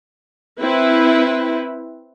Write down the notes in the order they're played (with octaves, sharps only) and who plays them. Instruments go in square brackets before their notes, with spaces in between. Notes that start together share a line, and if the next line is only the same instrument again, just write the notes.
[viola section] C4 E4 B4